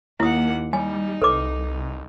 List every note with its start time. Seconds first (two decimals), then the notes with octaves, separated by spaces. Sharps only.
0.20 D#2 A#3 E4 F#5 D#6
0.73 G3 D#4 G#5
1.22 C2 A4 B4 D6